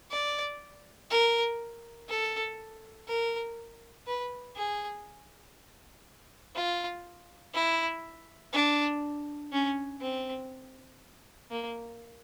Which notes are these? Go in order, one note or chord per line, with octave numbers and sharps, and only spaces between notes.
D5
A#4
A4
A#4
B4
G#4
F4
E4
D4
C#4
C4
A#3